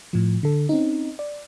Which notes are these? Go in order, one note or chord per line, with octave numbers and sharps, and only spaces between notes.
A2 F3
D3 A4
C4 C#4 D#4
D5